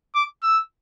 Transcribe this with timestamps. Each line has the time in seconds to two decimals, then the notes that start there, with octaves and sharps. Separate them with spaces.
0.15 D6
0.43 E6